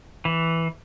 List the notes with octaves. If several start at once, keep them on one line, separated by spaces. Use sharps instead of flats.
E3